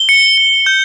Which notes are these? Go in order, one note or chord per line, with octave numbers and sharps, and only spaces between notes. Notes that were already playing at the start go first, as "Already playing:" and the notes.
Already playing: G7
C#7
C#7
G6